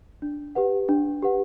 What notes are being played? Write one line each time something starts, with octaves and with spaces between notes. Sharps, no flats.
D4
G4 B4 F#5
D4
G4 B4 F#5